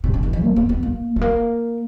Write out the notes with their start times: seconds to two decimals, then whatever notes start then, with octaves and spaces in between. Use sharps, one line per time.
0.04 C3
0.13 C#3
0.23 D#3
0.33 E3
0.43 A#3
0.56 A#3
0.69 B3
0.83 A#3
1.16 A3
1.22 A#3